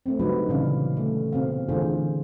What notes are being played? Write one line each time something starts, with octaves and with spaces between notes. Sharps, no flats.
A3 C4
D3 F#3 G3 D#4 F#4 B4
A#2 C#3 E3 C#4 D5 F5
A3
B2 C4 F5
D3 E3 A3 F4 G#4 C5